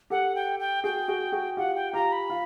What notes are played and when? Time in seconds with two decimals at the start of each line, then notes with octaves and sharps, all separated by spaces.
0.10 G4 A4 F#5
0.35 G5
0.60 G5
0.84 F#4 G#4 G5
1.08 F#4 G#4
1.32 F#4 G#4
1.57 F4 G4 F#5
1.75 G5
1.93 F4 G4 A#5
2.12 B5
2.30 F4